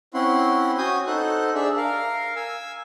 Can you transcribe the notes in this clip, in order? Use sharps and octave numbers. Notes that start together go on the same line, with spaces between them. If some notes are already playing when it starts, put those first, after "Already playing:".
C4 C#4 E4 F#5 C6
C#4 F#4 G#5 D#6 G6
D#4 A4 C5 F#5 F#6
D4 G#4 E5
A#4 F5
G#5 E6